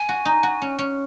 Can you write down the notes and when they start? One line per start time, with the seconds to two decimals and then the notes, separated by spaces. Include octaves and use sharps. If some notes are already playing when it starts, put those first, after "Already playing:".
Already playing: G#5
0.09 F#4
0.25 D#4
0.43 F#4
0.62 C#4
0.79 C#4